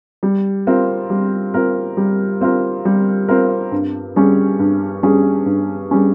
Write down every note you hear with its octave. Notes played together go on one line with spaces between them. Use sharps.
G3
C4 F4 A#4
G3
C4 F4 A#4
G3
C4 F4 A#4
G3
C4 F4 A#4
G2
G3 C#4 G#4
G2
G3 C#4 G#4
G2
G3 C#4 G#4